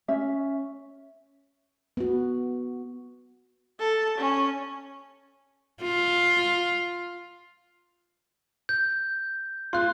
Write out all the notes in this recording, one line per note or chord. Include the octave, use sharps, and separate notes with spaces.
C#4 E5
B3 F#4
A4
C#4
F4
G6
F4 C6 F#6